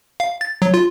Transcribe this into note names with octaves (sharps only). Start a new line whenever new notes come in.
F5
A6
F#3
F4